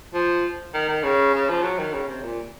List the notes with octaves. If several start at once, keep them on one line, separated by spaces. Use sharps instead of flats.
F3
D#3
D#3
C#3
C#3
F3
F#3
D#3
C#3
C3
A#2